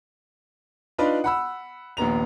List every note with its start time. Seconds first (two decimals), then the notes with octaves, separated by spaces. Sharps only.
0.98 D4 D#4 F4 B4 D5 D#5
1.24 F#5 B5 E6
1.97 A#1 D#2 B3 A#5 F7